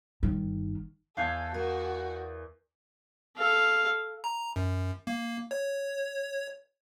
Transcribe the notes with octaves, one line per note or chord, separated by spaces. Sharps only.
G1 D#3
E2 A4 F5 G#5 F#6 G6
F#4 A#4
A4 F5
A#5
F#2
A#3
C#5